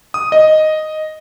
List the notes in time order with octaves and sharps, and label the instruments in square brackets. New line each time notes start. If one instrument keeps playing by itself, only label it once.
[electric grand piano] D#6
D#5